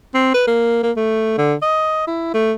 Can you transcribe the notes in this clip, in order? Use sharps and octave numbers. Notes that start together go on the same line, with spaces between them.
C4
B4
A#3
A#3
A3
D3
D#5
E4
A3